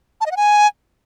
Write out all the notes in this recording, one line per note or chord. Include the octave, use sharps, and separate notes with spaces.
A5
D#5
F#5
G#5